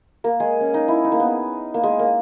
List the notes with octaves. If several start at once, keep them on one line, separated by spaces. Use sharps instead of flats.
A#3 A#4
G#3 G#4
C#4
D#4
E4
D#4
A#3
B3
A#3
G#3
A#3